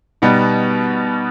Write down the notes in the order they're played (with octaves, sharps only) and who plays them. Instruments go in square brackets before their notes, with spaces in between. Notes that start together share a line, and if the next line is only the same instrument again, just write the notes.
[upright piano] B2 G3 B3 D#4